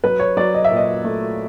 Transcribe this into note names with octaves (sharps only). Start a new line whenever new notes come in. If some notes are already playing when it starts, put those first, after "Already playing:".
F#3 B4
C#5
F#3 D5
D#5
E5
A#2
D#5
A3